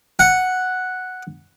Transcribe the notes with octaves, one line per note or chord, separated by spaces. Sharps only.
F#5